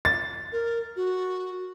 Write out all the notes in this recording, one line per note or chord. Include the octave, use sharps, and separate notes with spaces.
A6
A#4
F#4